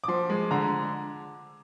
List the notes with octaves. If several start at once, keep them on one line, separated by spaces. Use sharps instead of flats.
D6
F3 C6
G#3
D3 A#5